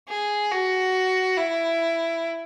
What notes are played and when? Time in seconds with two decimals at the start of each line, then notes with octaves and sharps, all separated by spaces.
0.09 G#4
0.51 F#4
1.37 E4